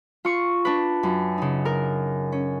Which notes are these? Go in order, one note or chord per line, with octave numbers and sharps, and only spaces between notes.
F4 C#6
D4 B4
F#2
C#3 D#4
A#4
C#4